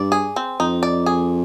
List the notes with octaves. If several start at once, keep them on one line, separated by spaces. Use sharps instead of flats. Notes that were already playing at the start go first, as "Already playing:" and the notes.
Already playing: G2 D5
G#4
C4
F2 D#4
D5
G#4